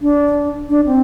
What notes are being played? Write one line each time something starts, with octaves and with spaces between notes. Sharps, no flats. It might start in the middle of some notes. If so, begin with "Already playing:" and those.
D4
D4
C4